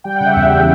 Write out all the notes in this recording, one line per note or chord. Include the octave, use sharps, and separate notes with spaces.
G3 G5
C#3 F#5
E5
E2